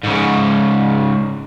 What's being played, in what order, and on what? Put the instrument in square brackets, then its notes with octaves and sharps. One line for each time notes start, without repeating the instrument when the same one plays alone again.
[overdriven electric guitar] G#2 C#3